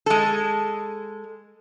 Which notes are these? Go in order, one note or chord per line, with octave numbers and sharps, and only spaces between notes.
G#3 A4